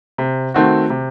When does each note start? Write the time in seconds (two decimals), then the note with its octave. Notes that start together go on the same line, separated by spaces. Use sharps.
0.18 C3
0.54 D#3 A3 C4 F#4
0.90 C3